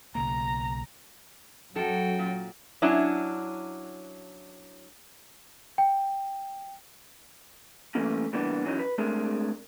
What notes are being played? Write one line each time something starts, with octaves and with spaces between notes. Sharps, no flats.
B1 C#3 A#3 A#5
F#2 F#3 C#4 F#4 A4 G5
A#2
F#3 C#4 D4 E4
G5
E3 G3 A3 A#3 C#4
C#3 E3 G3 A#3 B3 D4
F#2 E3 F#3 C#4 D#4
B4
G#3 A3 C4 D4 G#4 A#4